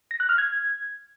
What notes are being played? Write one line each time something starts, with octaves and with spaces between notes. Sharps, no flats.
A#6
F#6
F6
G#6